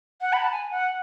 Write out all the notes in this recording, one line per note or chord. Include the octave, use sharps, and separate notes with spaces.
F#5
B5
A5
G#5
F#5